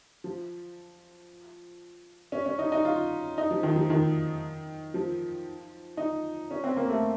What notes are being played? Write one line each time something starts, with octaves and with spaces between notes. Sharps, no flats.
F3
C#4
C#4
D#4
D#4
F4
D#4
F3
D#3
F3
D#3
F3
D#4
C#4
C4
A#3
A3